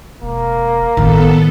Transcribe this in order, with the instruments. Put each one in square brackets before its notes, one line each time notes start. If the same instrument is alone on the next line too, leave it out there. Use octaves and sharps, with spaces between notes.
[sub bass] E1 [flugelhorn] A#3
[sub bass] G#1 [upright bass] A2 D#3 [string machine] B3 A4